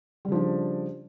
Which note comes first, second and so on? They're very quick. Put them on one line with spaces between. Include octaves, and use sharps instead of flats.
G3 C#3 F3 D4